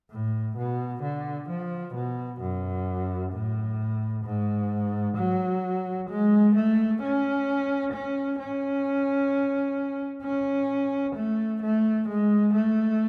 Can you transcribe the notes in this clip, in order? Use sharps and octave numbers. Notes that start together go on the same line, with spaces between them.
A2
B2
D3
F3
B2
F#2
A2
G#2
F#3
G#3
A3
C#4
C#4
C#4
C#4
A3
A3
G#3
A3